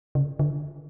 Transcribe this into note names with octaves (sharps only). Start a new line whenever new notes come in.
C#3
D3